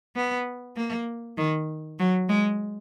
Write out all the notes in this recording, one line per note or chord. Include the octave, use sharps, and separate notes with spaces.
B3
A#3
D#3
F#3
G#3